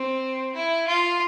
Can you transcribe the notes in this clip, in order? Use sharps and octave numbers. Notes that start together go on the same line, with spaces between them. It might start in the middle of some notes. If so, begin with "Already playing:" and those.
Already playing: C4
E4
F4